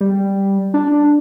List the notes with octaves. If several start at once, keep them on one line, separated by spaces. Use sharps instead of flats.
G3
D4